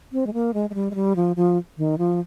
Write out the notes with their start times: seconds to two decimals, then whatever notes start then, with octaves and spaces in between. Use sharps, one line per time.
0.12 C4
0.27 G#3
0.34 A#3
0.54 G#3
0.70 G#3
0.74 G3
0.91 G#3
0.95 G3
1.16 F3
1.36 F3
1.78 D#3
1.98 F3